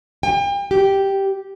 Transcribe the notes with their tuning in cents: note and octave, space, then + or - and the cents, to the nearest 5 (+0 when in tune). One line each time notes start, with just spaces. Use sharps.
G5 +40
G4 -5